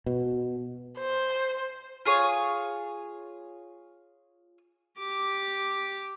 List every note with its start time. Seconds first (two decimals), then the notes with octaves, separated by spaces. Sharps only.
0.06 B2
0.99 C5
2.06 F4 G#4 C#5
4.98 G4 D6